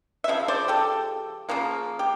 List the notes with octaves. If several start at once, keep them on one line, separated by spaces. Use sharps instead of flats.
E5
C#3 F3
C5 D5
G4 A4
C#3 F3 A#3
G4